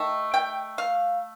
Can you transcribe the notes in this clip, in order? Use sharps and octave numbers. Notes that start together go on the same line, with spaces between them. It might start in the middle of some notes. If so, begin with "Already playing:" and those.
Already playing: D#3 A3 A5
G5
F5